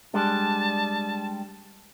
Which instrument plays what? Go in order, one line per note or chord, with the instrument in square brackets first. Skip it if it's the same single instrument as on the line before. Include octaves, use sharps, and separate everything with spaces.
[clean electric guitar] G3 G#3 D4 [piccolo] A5